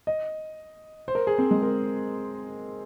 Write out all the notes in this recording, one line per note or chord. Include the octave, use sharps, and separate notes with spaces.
D#5
C5
A#4
G#4
C4
G#3
A#4